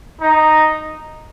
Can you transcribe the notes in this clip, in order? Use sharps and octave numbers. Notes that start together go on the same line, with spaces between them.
D#4